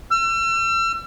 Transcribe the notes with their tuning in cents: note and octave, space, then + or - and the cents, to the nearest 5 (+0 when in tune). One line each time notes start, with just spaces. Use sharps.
E6 +40